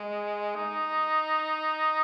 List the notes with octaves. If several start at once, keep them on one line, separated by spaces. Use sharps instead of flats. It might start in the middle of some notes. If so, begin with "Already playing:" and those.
Already playing: G#3
D#4